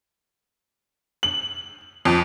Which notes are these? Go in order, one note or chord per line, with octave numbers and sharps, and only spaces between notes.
F#7
F2